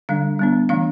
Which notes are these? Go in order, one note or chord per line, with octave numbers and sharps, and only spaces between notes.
D3 G3 D4 F5
G3 B3 D4
E3 A3 D4 F5